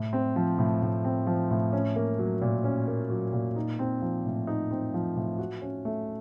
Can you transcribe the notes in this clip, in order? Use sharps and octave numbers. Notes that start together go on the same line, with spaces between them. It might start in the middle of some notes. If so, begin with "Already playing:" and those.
Already playing: A2
C4
F3
A2
A2
C4
F3
A2
C#4
A#3
F#3
A#2
C#4
A#3
F#3
A#2
D#4
C4
F3
A2
D#4
C4
F3
A2
F#4
C#4
A3